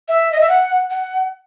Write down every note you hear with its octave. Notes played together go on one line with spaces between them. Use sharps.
E5
D#5
E5
F#5
F#5